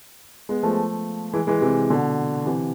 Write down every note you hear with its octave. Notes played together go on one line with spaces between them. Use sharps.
G#3 B3
F3 A3
E3 G#3
E3 G#3
C3 E3
B2 D3
C3 E3